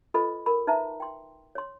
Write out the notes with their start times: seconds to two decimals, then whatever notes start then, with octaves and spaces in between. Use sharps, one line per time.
0.14 F4 A4 B4 D#5 B5
0.46 A#4 B5
0.67 D#4 B4 E5 A5 A#5
1.00 G5 C6
1.55 C#5 C6